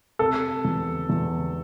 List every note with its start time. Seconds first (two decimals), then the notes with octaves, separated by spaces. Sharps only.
0.19 C3 A4
0.65 E2
1.09 E2